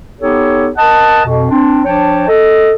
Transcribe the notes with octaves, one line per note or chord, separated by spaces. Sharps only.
B3 D#4 G4 A4 C#5
A#4 D#5 F#5 A5
F2 B2
C4 D4
F3 D4 C#5 G5 A5
A4 D#5